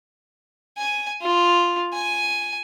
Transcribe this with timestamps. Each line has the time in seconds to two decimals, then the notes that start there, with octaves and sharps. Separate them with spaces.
0.78 G#5
1.22 F4
1.93 G#5